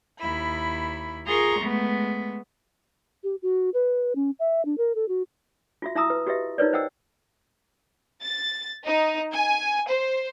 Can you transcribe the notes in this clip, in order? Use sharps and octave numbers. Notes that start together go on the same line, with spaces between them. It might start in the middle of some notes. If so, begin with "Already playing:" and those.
D#2 E4 B5
F4 G#4 A#4 A#5 C6 C#6
G#3 A3 B3
G4
F#4
B4
C#4
E5
D4
A#4
A4
F#4
F4 F#4 E5
E4 E5 A5 A#5 D#6 E6
B4
F#4 G4 B4 D#5 E5
D#4 F4 A#4 B4 C#5 D5
C5 D#5 F#5 G5 E6
A6
D#4
G#5
C5